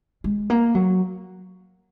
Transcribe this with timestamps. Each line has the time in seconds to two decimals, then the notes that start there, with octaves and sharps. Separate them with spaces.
0.24 G#3
0.50 A#3
0.75 F#3